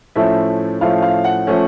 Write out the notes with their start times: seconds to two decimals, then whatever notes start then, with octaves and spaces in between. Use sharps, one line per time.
0.16 A2 F3 A3 C#4 E5
0.81 A2 F3 A3 C#4 F5
1.02 F5
1.24 F#5
1.47 F3 A3 C#4